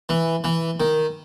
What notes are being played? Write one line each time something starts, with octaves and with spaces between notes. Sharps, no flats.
E3
E3
D#3